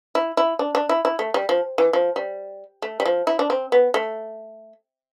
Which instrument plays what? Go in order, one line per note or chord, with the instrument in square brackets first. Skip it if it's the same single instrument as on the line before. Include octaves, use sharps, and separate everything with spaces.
[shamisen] E4
E4
D4
D4
E4
E4
A3
G3
F3
E3
F3
G3
A3
G3
F3
E4
D4
C4
B3
A3